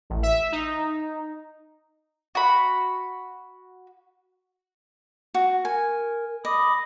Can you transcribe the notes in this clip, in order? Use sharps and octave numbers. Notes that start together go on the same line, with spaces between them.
A1
E5
D#4
F#4 B5
F#4
A#4 G#5
D#5 B5 D6 D#6